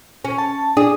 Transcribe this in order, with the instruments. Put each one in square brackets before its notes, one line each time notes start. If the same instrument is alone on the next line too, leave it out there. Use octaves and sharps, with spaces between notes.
[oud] C#4
[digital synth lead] A5
[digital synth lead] D4 [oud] G#4